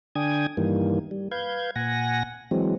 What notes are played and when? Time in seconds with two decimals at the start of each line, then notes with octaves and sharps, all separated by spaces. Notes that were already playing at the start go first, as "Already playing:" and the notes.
0.15 D3 D4 G5 G#5 D#6 G#6
0.57 G2 D#3 E3 G3 A#3
1.11 G3
1.31 B4 F5 G6 G#6
1.76 A#2 F#5 G#5 A#6
2.51 E3 F#3 G#3 C4